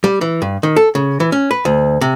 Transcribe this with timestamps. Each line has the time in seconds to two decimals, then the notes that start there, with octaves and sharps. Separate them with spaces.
0.04 G3
0.21 E3
0.42 G2
0.63 D#3
0.76 A4
0.95 C#3
1.20 E3
1.32 C#4
1.51 B4
1.65 D2
2.01 C3